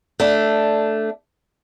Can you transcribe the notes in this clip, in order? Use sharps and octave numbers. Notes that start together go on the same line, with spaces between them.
A3 D4